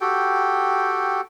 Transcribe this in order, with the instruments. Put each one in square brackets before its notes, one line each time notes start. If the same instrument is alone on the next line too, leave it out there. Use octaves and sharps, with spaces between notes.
[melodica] F#4 G4 A4 G5